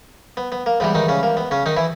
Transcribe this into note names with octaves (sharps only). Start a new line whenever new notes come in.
B3
B3
A#3
G#2 E3 G3 B3
D#3 D#4
C#3 C#4
A#3
B3
C#3 C#4
D#3 D#4
E3 E4